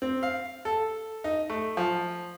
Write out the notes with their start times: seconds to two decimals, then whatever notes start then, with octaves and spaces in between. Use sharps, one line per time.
0.02 C4
0.23 F5
0.65 A4
1.24 D#4
1.50 A3
1.77 F3